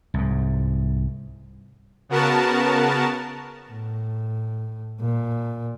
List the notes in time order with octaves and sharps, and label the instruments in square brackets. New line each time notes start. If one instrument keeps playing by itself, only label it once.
[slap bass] C2 G#2
[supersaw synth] C#3 B3 F#4 A#4 A5
[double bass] A2
A#2